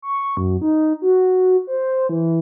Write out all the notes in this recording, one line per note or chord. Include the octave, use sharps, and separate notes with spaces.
C#6
F#2
D#4
F#4
C5
E3